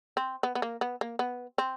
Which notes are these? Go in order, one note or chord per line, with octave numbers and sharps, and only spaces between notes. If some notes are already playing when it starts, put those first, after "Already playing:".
C4
B3
B3
A#3
B3
A#3
B3
C4